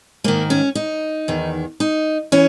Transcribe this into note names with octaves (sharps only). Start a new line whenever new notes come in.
G#2 D#3 A#3
C#4
D#4
E2 D#3
D#4
E3 C#4